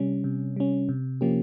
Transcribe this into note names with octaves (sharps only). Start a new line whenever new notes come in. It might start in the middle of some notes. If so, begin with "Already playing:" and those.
Already playing: C3 G3 C#4
C3
G3 C#4
C3
F3 A#3 C#4 G4